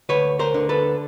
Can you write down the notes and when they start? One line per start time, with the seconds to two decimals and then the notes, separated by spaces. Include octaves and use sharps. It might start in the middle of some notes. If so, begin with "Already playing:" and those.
0.09 D2 B4 C#5
0.39 A#4 C5
0.54 D3
0.69 A4 B4